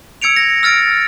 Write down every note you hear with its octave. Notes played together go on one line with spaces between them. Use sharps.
E6 G#6 C#7 D7 F7
A#6
E6 F6 A6 D7